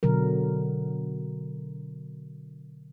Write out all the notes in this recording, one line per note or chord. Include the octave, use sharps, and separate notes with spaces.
B2 D3 F#3 A#4